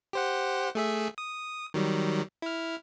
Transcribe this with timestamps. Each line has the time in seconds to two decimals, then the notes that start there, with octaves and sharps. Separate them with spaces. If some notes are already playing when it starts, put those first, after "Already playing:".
0.13 G4 C5 F#5
0.75 A3 G#4 E5
1.18 D#6
1.74 D#3 F#3 G3
2.42 E4 F6